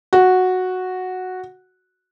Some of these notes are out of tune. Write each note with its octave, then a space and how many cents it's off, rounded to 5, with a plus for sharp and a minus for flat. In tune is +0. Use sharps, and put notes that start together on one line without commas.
F#4 -5